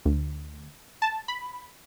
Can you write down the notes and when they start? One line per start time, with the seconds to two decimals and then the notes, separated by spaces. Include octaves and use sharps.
0.05 D2
1.02 A5
1.28 B5